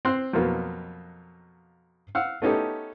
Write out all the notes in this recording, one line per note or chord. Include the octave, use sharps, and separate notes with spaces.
C4 C6 F#6
F2 B2 F#3 A#3 B3
F5 F#5 E6
A3 B3 C#4 D#4 G4 A4